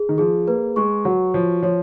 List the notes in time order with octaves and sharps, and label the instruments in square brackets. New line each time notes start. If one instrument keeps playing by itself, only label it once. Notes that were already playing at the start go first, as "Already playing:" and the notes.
Already playing: [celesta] G#4
[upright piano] D#3
[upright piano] F3 [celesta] G#4
[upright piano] A#3 [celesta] B4
[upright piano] G#3 [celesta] C#6
[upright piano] F#3 [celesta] F#4
[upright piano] F3 [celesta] C#5
[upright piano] F3 [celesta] C#5